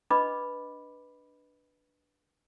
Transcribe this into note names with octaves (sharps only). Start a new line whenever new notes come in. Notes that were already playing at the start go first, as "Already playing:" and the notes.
D4 B4 D#5 B5 D6